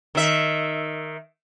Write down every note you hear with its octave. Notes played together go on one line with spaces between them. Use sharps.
D#3 E5